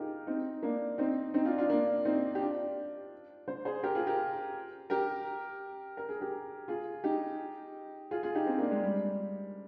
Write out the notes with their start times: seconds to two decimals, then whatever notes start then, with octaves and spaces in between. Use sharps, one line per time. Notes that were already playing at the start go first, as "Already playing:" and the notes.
Already playing: D#4 F4 G4 G#4 A#4
0.27 C4 D#4
0.63 A#3 D4
0.98 C4 D#4
1.34 C4 D#4
1.45 D4 F4
1.58 D4 F4
1.70 A#3 D4
2.05 C4 D#4
2.35 G4
2.41 D4 F4
3.48 C5
3.65 G#4 C5
3.83 G4 A#4
3.95 F4 G#4
4.07 G4 A#4
4.90 G4 A#4
5.97 A#4
6.09 G#4
6.20 G4 A#4
6.68 F4 G#4
7.04 D#4 G4
8.11 F4 G#4
8.23 F4 G#4
8.35 D#4 G4
8.46 C4 D#4
8.58 A#3 D4
8.71 G#3
8.82 G3